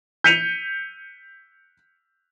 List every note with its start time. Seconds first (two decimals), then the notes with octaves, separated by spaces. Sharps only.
0.24 G6 B6 C#7 D#7 F7